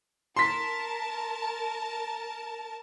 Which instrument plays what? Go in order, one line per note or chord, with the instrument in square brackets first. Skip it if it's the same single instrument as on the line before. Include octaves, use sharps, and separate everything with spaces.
[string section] A#4 A5 [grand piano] C6 B6